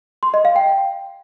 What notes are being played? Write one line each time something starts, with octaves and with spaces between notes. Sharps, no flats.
C6
D#5
F5
G5